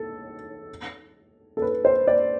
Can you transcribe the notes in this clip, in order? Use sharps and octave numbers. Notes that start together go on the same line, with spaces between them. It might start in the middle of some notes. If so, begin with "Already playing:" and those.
Already playing: A4
A4
B4
C5
D5